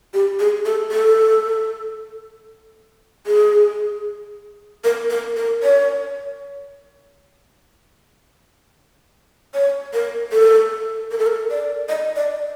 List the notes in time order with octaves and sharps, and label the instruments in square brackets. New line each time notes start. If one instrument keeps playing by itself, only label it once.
[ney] G4
G#4
A4
A4
G#4
A#4
A#4
A#4
C#5
C#5
A#4
A4
A#4
A4
A#4
D5
D#5
D5